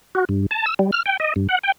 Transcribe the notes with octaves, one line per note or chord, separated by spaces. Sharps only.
F#4
G2
A5
E6
G3
F6
G5
D#5
G2
F#5
G5